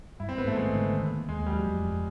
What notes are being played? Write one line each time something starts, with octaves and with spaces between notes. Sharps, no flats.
G2 E4
C4
G#1 B3
A3
G#1 G#3
D3
D#3
A#3
D#2 G#3
F#3 G3
F2
G1